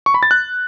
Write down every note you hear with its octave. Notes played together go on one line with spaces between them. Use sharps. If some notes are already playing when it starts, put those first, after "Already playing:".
C#6
B5
A6
F#6